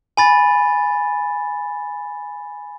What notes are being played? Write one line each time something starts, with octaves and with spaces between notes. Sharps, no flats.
G#5 B5 A6